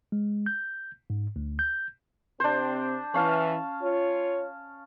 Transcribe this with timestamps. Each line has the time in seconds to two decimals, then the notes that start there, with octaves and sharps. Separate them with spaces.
0.12 G#3
0.46 G6
1.10 G#2
1.36 D2
1.59 G6
2.40 C3 C4 D4 C5
3.14 E3 C#4 F5 A5
3.81 F4 C#5